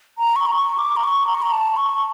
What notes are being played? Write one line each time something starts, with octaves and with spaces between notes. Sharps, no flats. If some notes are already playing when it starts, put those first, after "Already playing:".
A#5
C#6
A#5
C#6
D6
A#5
C#6
A#5
C#6
A#5
A5
C#6